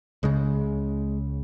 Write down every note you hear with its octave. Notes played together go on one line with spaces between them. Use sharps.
C#2 C#3 G#3